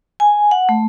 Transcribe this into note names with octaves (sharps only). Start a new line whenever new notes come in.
G#5
F#5
A3